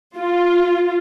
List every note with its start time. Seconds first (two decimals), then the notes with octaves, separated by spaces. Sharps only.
0.18 F4